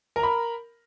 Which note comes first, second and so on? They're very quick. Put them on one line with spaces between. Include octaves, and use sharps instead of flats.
A#4 A#5 B5